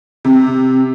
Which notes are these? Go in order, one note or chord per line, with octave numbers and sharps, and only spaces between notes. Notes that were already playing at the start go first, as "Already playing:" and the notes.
C3